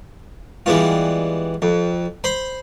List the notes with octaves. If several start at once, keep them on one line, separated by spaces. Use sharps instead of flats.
E3 G3 G#3 B3 F4
F2
C5 B5 C6